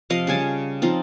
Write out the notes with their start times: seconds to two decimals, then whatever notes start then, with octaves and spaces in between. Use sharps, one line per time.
0.10 C3 F3 D#5 F5
0.27 C#3 G3 G#5 A5
0.82 F3 C4 D#4 F4